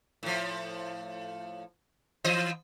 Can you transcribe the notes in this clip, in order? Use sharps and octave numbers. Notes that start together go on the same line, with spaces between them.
A2 F3
E3 C5 D#5